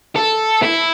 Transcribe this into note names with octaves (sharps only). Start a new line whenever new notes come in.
A4
E4